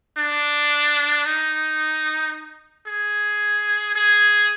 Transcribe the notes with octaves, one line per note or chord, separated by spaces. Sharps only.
D4
D#4
G#4
G#4